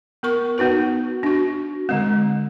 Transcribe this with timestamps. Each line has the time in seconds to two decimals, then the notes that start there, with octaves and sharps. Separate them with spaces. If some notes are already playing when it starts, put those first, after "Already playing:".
0.23 B3 A#4 C#6
0.58 B3 D#4 F#4 B4
1.23 D4 F#4
1.89 D3 G#3 C4